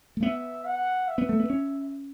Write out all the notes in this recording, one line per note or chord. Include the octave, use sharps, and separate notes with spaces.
A3
B3 E5
F#5
E5
B3
A3
B3
C#4